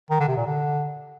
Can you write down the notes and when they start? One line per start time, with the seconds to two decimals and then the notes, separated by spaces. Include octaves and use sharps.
0.11 D#3
0.20 D3
0.28 C3
0.37 A#2
0.47 D3